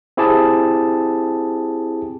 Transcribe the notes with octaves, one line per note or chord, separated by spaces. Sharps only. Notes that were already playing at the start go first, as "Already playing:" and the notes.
C4 E4 G4 G#4 A5